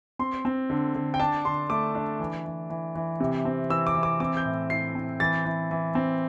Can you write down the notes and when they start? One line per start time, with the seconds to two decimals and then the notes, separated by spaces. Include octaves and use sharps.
0.19 C4 C6
0.45 C4
0.70 D3
0.95 D3
1.14 G5
1.20 D4 A5
1.45 D3 C6
1.70 A3 D6
1.95 D4
2.20 E3
2.45 E3
2.70 E3
2.95 E3
3.20 C3
3.45 C4
3.70 E3 E6
3.87 D6
3.95 E3
4.03 D6
4.20 C4 D6
4.37 G6
4.45 A2
4.70 E4 C7
4.95 C4
5.20 E3 A6
5.45 E3
5.71 E3
5.95 C4